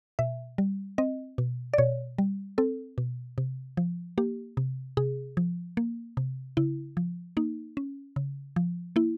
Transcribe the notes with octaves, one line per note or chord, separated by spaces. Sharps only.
B2 E5
G3
C4 D#5
B2
D5
B2 C#5
G3
C4 A4
B2
C3
F3
A#3 G4
C3
C3 G#4
F3
A#3
C3
C#3 E4
F3
A#3 D#4
C#4
C#3
F3
A#3 E4